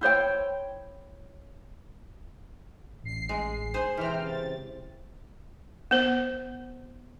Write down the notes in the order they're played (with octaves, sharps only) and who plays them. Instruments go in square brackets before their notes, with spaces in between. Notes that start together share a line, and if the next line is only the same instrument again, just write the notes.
[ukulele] E4 C5 C#5 G5
[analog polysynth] A1 C7
[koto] G#3
G#4 C5
[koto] C3 E3 [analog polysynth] C5 G5 F6
[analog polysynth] C#3 A6
[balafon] B3 C5